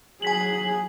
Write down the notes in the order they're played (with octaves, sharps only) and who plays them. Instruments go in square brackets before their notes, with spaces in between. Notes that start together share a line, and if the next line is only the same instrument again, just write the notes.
[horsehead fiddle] F#3 G#4 [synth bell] G#5 B6 F#7